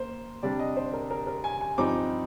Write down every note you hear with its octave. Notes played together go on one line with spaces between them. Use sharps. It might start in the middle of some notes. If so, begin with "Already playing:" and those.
Already playing: A#3 C5
C3 G3 D4 D5
D#5
C5
A#4
A#4
A#4
G#5
G#5
G2 F3 C4 D#4 D6